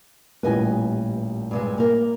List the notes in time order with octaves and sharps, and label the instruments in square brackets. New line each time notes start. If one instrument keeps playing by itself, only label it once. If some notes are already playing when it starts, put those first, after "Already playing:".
[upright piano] A1 A#2 G3 [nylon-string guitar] B4 D#5 G#5
[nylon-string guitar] G2 C3 G#3
A#3 A#4